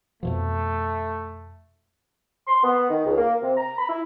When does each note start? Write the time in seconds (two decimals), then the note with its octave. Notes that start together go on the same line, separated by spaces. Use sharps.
0.23 F2 B2 F3 A3
2.48 C6
2.64 B3
2.90 D#3
3.06 C#2
3.17 A#3
3.41 C3
3.57 A#5
3.78 B5
3.89 E4